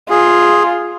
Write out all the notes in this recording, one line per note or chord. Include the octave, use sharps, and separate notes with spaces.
F4 G#4